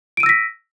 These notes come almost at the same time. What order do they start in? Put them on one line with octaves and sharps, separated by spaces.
D7 D#7 E6 A#6 B6